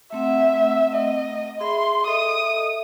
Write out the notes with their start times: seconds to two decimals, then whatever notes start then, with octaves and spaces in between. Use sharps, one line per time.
0.13 A3 C4 E5 F#5
0.94 D#5
1.61 G#4 E5 B5 C6
2.07 A4 D#5 E5 D#6